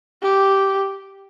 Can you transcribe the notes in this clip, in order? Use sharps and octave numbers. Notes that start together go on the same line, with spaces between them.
G4